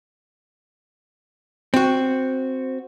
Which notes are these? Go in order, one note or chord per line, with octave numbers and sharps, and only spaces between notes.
C4 F#4